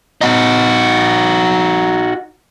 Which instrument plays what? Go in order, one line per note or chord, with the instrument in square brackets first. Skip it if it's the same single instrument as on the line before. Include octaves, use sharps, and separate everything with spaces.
[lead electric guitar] D#4 F#4